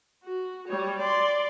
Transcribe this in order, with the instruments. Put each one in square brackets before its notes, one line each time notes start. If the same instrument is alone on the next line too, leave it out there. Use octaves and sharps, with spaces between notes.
[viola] F#4
G3 C#5
D5 C6